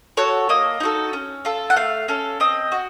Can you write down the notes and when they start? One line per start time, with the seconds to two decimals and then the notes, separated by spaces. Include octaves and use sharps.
0.17 F#4 A4 C#5
0.49 A#3 D#5
0.80 D#4 F#4 A4
1.13 C#4
1.45 F4 A4
1.70 F#5
1.76 A3 F5
2.08 C#4 A4
2.40 C4 D#5
2.72 F#4